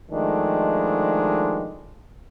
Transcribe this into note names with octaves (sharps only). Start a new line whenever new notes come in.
D#3 F3 G#3 A3 D4